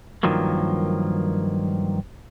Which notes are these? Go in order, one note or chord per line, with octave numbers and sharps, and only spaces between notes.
G2 D#3 F3 F#3 A#3